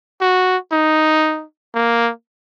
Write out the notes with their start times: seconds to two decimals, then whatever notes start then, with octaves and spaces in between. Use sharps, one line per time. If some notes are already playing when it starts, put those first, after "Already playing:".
0.21 F#4
0.72 D#4
1.75 A#3